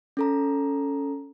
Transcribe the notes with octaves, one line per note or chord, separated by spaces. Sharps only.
C#4 A4 A#5